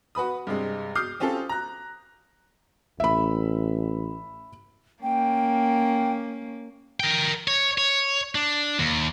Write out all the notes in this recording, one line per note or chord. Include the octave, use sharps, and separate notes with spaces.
F#4 B4 B5 D#6
G2 C3 G#3
D6 D#6 F6 G6 C7
C4 C#4 F4 G4 A4
A#5 F#6
A1 E5 B5
A#3 C#4 G5
A#4 G5
C#5
C#5
D4
D#2